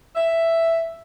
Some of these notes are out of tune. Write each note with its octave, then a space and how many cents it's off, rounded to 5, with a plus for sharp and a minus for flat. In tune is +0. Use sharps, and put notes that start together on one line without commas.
E5 +5